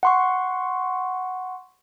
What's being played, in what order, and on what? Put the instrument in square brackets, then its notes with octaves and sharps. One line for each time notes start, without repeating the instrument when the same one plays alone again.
[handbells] F#5 C6 C#6